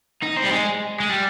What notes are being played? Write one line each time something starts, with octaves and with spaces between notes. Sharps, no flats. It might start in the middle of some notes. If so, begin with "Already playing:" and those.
D#4
C4
G3
G#3
G#3
G3